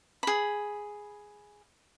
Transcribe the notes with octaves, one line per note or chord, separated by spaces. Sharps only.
G#4 B5